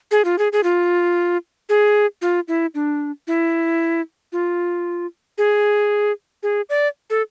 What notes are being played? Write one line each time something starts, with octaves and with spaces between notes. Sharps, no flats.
G#4
F4
G#4
G#4
F4
G#4
F4
E4
D4
E4
F4
G#4
G#4
D5
A4